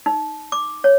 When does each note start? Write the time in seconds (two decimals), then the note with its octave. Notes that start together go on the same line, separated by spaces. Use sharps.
0.06 D#4
0.52 D6
0.84 C#5